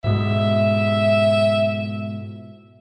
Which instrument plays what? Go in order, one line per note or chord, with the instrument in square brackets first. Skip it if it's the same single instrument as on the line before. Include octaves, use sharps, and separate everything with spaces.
[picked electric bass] G#2 B2 G#3 [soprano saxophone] E5